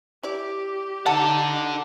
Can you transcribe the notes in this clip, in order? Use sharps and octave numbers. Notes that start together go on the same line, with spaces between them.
E4 G4 D5
D#4 A4 D5 F#5 A5